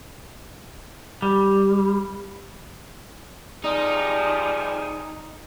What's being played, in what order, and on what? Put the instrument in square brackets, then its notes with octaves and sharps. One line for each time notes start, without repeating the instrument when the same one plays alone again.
[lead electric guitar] G3
[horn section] C3 F3 G3 [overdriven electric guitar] D#4 [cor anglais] G#4 [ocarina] D5